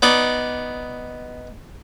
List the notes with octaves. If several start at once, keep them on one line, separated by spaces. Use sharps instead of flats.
B3 D#4 D5 D#5